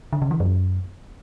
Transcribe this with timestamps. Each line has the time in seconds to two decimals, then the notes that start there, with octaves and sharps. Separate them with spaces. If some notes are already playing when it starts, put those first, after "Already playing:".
0.13 D3
0.22 C#3
0.31 E3
0.40 F#2